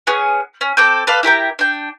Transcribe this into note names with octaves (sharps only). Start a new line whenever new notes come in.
B3 C#4 G#4
C#4
C4 A4 D6 G6
A4 B4 D5 F5
E4 G4 A#4 G5
D4 G5